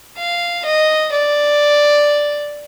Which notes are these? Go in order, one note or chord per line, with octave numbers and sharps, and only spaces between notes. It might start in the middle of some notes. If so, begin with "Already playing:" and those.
F5
D#5
D5